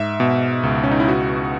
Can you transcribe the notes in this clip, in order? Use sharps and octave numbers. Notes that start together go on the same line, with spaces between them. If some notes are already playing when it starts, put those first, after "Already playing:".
Already playing: G#2 E5
B2
C#2
C#4
D#4
E4
F#4